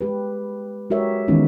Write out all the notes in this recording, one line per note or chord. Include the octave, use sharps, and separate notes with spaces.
G#3 G4 B4
G#3 F#4 G4 A#4 C#5 E5
D#3 E3 G#3 B3 C#4 D#4